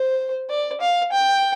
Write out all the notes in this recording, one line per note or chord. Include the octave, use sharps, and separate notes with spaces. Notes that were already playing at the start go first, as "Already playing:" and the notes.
Already playing: C5
D5
F5
G5